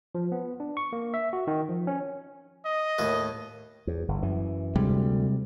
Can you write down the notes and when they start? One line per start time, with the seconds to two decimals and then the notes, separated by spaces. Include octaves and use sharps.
0.15 F3
0.32 B3
0.60 D4
0.77 C#6
0.93 A#3
1.14 E5
1.33 F#4
1.47 D#3
1.69 F3
1.87 C#4
2.65 D#5
2.98 D#2 A2 B4
3.87 E2
4.08 G1
4.23 F#2 E3
4.75 D2 C3 G3 G#3